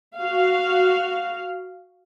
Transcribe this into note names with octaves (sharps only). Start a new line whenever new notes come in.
F#4 F5